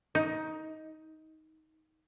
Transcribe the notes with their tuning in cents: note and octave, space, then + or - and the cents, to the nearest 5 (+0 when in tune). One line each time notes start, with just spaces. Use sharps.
D#4 +15